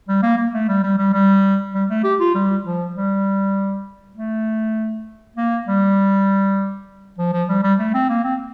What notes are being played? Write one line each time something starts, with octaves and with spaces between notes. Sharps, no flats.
G3
A#3
A#3
A3
G3
G3
G3
G3
G3
A3
G4
F4
G3
F3
G3
A3
A#3
G3
F3
F3
G3
G3
A3
C4
A#3
C4